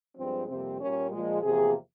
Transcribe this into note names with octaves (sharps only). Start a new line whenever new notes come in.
G2 F3 G#3 C4
F2 C3 G3 A#3 C4
A#2 G3 A#3 C#4
A#2 F3 G#3
E2 C3 F3 A#3 G#4